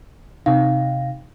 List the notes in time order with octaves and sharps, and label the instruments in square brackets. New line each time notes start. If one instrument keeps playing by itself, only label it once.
[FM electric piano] C3 D#4 [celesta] F5